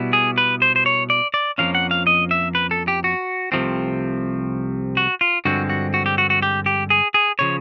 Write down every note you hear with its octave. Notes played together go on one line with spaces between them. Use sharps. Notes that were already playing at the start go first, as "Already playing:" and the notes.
Already playing: B2 G3 B3 E4
G#4
B4
C5
C5
C#5
D5
D5
F2 C3 F3 A#3 C#4 F5
F#5
F5
D#5
E5
B4
A4
G4
F#4
C2 C3 F3 A3 C4
F#4
F4
G2 D3 F3 G#3 C4 F#4
F#4
F#4
G4
F#4
F#4
G4
G4
G#4
G#4
C#3 F3 C#5